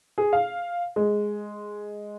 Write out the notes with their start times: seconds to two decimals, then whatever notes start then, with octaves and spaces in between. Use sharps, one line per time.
0.18 G#4
0.33 F5
0.96 G#3